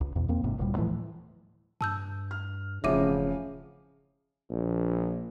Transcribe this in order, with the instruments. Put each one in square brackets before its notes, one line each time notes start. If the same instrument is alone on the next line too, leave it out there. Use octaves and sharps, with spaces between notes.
[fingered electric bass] C#2
E2 B2
E2 A#3 C4
G1 G#2 C3
D1 D2 A#2 G3
A2 E3 F3 A3
[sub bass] G2 [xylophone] A5 E6 G6
[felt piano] F6
[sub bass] E1 [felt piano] A1 F2 [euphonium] C#3 [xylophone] E5 D6 D#7
[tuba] A#1